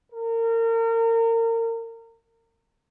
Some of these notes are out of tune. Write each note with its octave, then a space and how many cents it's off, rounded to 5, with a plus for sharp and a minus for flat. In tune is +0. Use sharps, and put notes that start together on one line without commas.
A#4 -30